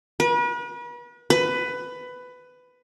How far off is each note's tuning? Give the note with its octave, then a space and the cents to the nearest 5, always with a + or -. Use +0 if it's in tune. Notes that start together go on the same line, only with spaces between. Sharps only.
B4 -40
B4 +15